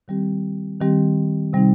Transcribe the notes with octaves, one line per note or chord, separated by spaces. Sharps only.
D#3 G3 C4 G4
D#3 G3 C4 G4
C3 G3 C4 D#4